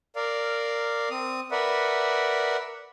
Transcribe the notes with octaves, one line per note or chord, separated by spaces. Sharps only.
A#4 D5 F5
C4 D#6
A#4 B4 D5 E5 F#5